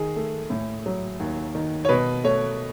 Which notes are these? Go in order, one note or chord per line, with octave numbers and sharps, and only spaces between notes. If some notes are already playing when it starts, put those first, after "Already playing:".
Already playing: D#3 G#4
A3
A2
F#3
D#2
D#3
C#5
B2 B4
A3 C#5